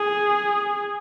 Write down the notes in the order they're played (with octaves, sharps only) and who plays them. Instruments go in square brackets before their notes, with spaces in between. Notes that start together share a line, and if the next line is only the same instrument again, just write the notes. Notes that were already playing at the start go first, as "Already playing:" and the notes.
Already playing: [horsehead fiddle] G#4